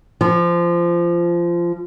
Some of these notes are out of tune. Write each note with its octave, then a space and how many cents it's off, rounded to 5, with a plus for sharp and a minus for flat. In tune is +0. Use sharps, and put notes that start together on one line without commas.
F3 -20